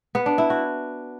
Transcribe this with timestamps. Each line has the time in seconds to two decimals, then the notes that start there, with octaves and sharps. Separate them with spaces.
0.15 B3
0.26 D4
0.38 E4
0.50 F#4